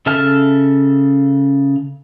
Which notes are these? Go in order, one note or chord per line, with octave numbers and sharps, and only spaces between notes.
C#3 A4 E5 A5 F6